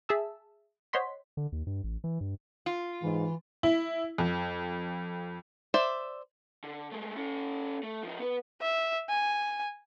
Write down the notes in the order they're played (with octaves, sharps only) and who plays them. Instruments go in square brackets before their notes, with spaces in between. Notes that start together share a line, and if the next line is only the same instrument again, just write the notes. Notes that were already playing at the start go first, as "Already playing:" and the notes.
[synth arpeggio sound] G#4 E5 A5 E6
C5 C#5 D#5 F#5 C6 B6
[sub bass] D3
D#2
G2
A1
E3
G2
[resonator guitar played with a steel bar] F4
[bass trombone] G#2 [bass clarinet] E3
[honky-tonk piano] E4
F2
[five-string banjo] C5 D5 E5
[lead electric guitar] D3
G#3 A3
C#4 A4
A3
F3 D#4
B3 B4
[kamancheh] E5
G#5